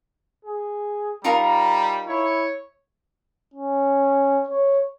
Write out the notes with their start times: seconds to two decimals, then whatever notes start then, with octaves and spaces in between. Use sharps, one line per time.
0.45 G#4
1.24 G3 D#4 F4 A#4 A#5
2.07 E4 C#5
3.54 C#4
4.49 C#5